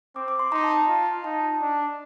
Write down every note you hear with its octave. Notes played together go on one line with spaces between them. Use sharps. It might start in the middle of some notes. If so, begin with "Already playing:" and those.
C4 D6
D6
C6
D#4 A#5
A5
F4 A#5
D#4 A5
D4